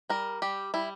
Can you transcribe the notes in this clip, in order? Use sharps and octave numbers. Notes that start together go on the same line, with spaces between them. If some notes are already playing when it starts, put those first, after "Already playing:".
G3 A#4
G3 G4
G3 E4